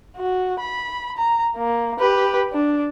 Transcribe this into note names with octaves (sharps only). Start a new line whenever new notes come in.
F#4
B5
A#5
A#3
G4 B4
D4